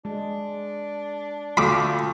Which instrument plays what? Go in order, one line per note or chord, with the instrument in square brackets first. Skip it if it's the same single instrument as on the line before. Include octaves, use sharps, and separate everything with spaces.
[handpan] G#3 [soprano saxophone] D4
[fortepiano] D2 [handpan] F4 A4 [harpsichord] B5 D6